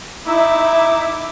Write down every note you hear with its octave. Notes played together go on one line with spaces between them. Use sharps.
D#4 E4 E5 D6